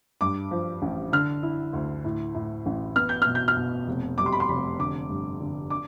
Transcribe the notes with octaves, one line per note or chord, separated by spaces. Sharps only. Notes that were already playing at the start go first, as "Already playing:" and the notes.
G2 D6
F3
A1
D3 F6
E4
D2
A2
A2
A1
B3 F6
G6
B2 F6
G6
F6
B2
F1
G3 D6
C6
B5
C6
F1 B5
D3 D6
G2
D3
D4 D6